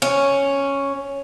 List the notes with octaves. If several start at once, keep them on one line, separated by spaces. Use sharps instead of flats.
C#4